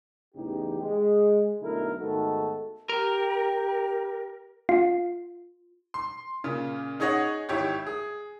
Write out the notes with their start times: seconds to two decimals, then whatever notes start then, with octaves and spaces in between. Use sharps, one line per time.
0.35 A1 E2 C#3 D#4 G4
0.81 G#3
1.61 B1 D3 A3 D#4 E4 A#4
2.00 G#2 D#3 A3 B3 F#4 A4
2.89 G4 A#4
4.69 F4
5.94 C6
6.44 A#2 C#3
7.00 D#4 G#4 C#5 D#5 F#5
7.49 G#1 E4 G4 C#5 G#6
7.87 G#4